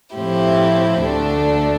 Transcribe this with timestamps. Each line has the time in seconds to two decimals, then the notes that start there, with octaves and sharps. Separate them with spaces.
0.16 A2 F3 C4 E4 G4
1.01 D2 D3 A3 D4 A4